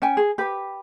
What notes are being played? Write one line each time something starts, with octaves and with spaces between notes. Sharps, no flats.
C#4 G5 G#5
G#4
G4 B4